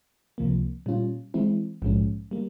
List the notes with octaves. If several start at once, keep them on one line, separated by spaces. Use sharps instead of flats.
C#2 C3 F3 A#3
A#2 G3 C#4 F4
E3 G#3 C4 E4
A#1 G#2 F3 G#3 C#4
G3 A#3